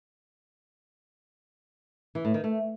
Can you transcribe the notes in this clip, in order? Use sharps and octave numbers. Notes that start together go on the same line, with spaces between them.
E3
A2
D#3
A3